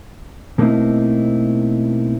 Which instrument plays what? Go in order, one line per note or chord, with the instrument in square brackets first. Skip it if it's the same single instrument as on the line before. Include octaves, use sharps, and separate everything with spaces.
[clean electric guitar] B2 A3 A#3 C4 D#4 E4